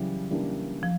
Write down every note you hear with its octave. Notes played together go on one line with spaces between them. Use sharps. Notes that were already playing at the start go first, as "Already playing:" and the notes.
Already playing: C#3 E3 F#3 G3
C#3 E3 G3 A#3 D4
F3